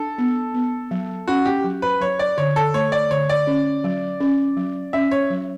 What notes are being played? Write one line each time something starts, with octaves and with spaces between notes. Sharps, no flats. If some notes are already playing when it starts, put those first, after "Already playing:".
Already playing: D4 A4
B3
B3
F#3
C#4 F#4
G4
F#3
B4
F#3 C#5
D5
D3 C#5
A4
A3 C#5
D5
D3 C#5
D5
C#4
F#3
C#4
F#3
C#4 E5
C#5
F#3